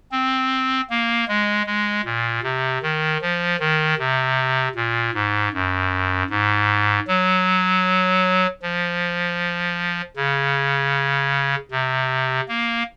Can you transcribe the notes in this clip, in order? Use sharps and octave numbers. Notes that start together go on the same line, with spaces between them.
C4
A#3
G#3
G#3
A#2
C3
D#3
F3
D#3
C3
A#2
G#2
F#2
G#2
F#3
F3
C#3
C3
A#3